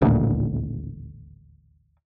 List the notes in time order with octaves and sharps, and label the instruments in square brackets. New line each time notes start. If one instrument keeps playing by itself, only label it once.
[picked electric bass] D#1 A1 D2 A#2